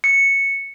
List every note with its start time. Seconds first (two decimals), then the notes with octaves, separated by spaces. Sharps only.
0.04 C#7